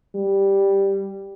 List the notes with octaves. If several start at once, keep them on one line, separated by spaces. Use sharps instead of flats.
G3